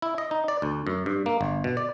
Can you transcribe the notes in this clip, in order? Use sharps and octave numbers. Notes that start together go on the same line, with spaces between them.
E4
D#5
D#4
D5
D2
F#2
G2
A#3
G1
B2
D5